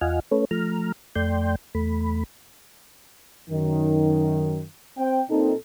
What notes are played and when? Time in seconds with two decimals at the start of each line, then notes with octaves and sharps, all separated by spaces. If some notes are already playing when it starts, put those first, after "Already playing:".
0.01 E2 F4 D#5 F#5 G#5 F6
0.31 A3 C#4 A4 B4 C#5
0.51 F3 A3 A#5 F6
1.16 F2 A3 D5 G5 C6 G6
1.75 E2 A3 B5
3.50 F#2 D#3
4.98 C4 G5
5.30 A#2 C4 D#4 A4